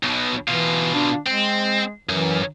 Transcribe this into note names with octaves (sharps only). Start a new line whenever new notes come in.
B1 B2
B2 E3 F4
D4
G#3 C4
F#2 E3